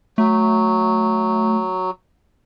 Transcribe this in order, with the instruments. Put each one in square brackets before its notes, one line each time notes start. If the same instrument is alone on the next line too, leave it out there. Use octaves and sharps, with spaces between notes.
[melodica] F#3 [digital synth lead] A3